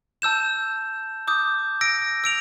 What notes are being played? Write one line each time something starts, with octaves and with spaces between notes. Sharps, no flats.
A5 E6 G6 E7
D6 D#6 G6
E6 A#6 D7
E6 D7 F7